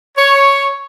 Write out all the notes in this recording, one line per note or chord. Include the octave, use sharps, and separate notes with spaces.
C#5